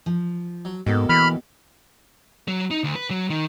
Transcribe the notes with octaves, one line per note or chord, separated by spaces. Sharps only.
F3
F#3
G#2 B2 A#3 A4 G5
E3 B5 F6
F#3
D#4
D2
B4
F#3
D#3